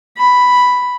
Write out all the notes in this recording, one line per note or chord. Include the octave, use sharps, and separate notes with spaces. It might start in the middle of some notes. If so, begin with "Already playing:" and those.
B5